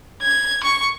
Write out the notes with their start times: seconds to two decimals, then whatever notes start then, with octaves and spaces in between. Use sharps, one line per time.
0.22 G#6
0.64 C#6